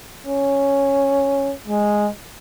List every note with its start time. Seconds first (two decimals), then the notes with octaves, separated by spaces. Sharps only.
0.26 C#4
1.67 G#3